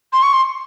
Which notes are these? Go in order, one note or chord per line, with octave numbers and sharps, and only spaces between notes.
C6
C#6
C6